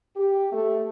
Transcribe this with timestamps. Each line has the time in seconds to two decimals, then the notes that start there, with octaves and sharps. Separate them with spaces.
0.17 G4
0.52 A3